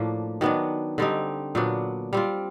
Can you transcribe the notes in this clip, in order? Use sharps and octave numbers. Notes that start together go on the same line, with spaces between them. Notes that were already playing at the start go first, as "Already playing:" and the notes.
Already playing: A2 F3 A#3 D4
D#3 F#3 B3 D4
D3 G3 C4 D#4
A#2 F#3 B3 D4
G3 C4 F4